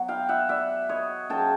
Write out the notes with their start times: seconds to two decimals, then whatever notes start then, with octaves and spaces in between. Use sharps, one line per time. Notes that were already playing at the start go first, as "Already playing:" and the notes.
Already playing: B2 F#3
0.08 F5 G5
0.29 E5 F#5
0.49 D5 E5
0.89 C#5 D#5
1.30 C#3 F#3 G5 A5